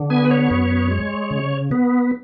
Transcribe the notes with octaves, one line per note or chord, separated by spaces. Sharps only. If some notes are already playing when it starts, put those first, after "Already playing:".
Already playing: D3
B3 G#5
B4
C#5
F#2
G#3
C#3
B3